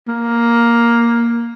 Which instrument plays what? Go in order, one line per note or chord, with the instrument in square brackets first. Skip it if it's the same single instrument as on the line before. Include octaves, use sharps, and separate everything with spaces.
[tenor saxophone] A#3